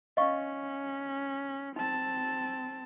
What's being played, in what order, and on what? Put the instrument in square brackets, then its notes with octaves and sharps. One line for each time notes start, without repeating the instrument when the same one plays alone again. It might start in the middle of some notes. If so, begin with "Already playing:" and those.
[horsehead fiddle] C#4 [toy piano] D#5 F5 C#6
[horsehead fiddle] C4 A5 [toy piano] D#4